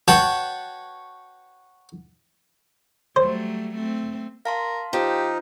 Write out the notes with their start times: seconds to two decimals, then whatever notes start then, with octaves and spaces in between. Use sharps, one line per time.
0.08 F#4 B4 C#5 G5 A5
3.16 F#3 G3 A3 C5
3.75 A3 C4
4.45 A#4 F5 A5 C6
4.93 F3 D#4 G4